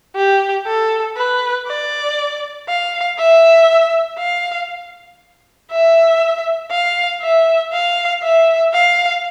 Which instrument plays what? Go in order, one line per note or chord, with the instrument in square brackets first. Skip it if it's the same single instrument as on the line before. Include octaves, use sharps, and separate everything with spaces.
[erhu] G4
A4
B4
D5
F5
E5
F5
E5
F5
E5
F5
E5
F5